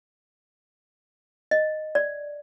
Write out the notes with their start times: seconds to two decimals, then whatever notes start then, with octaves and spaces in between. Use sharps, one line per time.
1.51 D#5
1.95 D5